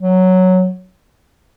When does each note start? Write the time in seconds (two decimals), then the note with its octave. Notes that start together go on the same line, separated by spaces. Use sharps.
0.01 F#3